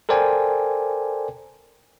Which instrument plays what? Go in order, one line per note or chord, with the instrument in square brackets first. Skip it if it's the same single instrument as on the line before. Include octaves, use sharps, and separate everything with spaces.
[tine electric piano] A4 A#4 C5 D5 G5 G#5